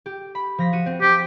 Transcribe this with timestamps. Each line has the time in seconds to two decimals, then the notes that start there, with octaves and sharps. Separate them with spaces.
0.06 G4
0.35 B5
0.58 F3 A#6 B6
0.73 F#4 D#7
0.86 C4
1.02 C4 G4